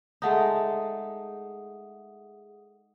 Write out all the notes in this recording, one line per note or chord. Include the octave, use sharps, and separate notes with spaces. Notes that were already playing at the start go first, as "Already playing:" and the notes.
G#3 A3 D#4 G#4 F#5 D#6